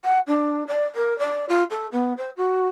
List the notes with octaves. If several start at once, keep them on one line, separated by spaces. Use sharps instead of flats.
F#5
D4
D5
A#4
D5
F4
A4
B3
C5
F#4